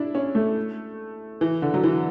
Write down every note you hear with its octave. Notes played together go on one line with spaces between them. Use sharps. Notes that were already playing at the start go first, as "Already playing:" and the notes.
Already playing: D4 E4
C#4
A3
E3
D3
F#3
E3